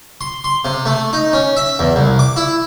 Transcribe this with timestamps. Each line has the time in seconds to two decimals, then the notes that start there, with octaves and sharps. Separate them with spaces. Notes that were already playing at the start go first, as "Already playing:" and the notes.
0.21 C6
0.44 C6
0.65 C3
0.86 A3
1.13 D#4
1.33 C#4
1.57 E5
1.79 E2
1.96 C2
2.19 D6
2.37 E4